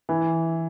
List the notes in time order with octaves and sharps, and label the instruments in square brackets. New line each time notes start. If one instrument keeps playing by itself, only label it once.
[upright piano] E3